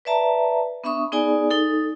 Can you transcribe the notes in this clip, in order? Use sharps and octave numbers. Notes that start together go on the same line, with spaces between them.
B4 D5 E5 A5 A#5
B3 D4 E5 B5 C#6 D#6
B3 D#4 G#4 D5 G#5
D#4 A4